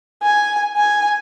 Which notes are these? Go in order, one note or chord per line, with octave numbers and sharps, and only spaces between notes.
G#5
G#5